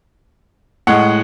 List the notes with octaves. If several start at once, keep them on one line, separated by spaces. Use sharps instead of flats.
A2 G#3 F#5